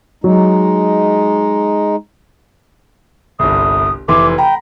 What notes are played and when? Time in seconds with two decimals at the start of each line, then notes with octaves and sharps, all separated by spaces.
0.24 F#3 G#3 D#4
3.39 G1 C2 D#6
4.08 F1 E3 C6 D6
4.38 G5 A#5 B5